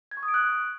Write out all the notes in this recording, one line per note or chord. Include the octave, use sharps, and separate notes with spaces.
G#6
C#6
D#6
D7
F#6